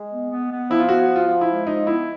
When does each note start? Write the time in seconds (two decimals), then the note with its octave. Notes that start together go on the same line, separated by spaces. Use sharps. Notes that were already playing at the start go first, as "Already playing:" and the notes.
Already playing: G#3
0.11 B3
0.30 B3
0.51 B3
0.70 F3 E4
0.79 F4
0.89 B3 F#4
1.08 F3
1.16 F4
1.28 F3
1.41 E4
1.48 G#3
1.67 F3 D#4
1.87 B3 E4